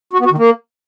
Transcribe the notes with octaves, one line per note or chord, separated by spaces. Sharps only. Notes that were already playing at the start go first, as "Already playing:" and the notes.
F#4
B3
F#4
D#3
A#3